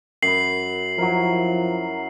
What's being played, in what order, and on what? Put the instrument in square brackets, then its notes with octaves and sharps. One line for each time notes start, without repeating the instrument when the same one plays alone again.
[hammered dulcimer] F#2 B5 [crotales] C7 F#7
[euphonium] F3 [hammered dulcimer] F#3 E4 A#4